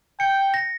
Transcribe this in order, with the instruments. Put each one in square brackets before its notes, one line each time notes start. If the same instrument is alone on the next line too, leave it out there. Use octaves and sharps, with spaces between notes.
[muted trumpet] G5 [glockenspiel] C#7
[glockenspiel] A#6